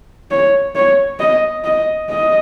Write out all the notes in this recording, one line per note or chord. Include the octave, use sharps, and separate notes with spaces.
C#5
C#5
D#5
D#5
D#5